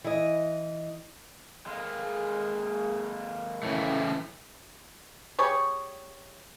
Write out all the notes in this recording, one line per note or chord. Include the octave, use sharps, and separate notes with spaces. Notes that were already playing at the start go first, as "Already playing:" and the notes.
E3 D#5
G#3 A#3
G#4
A2 C#3 E3 A3
G3 G#4 C#5